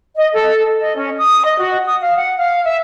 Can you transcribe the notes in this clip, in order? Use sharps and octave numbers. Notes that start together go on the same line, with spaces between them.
D#5
A4
D#5
C#4
D#6
D#5
F#4
D#6
F5
F#5
F5
E5